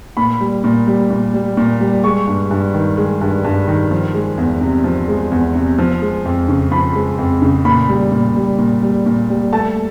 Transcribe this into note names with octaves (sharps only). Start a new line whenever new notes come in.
A#2 B5
G3
A#2
G3
A#2
G3
A#2
G3
G#3 C#6
G2
G2
D#3
G#3
G2
G2
D#3
F3
G#3
E2
C3
F3
G#3
E2
C3
F3
G#3
F2
C#3
F3 B5
G#3
F2
C#3
A#2 B5
G3
A#2
G3
A#2
G3
A#2
G3
A3 A5